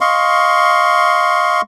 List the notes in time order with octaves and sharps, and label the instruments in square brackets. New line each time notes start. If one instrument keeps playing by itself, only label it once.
[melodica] D#5 F5 C6 C#6